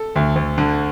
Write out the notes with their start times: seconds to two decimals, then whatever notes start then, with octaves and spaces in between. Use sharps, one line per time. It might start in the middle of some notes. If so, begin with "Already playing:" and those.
Already playing: A4
0.16 D2
0.36 D2
0.58 D3